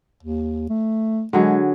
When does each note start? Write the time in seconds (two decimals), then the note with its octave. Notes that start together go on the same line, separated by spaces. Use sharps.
0.23 D#2
0.70 A3
1.33 D3 F#3 G#3 G#4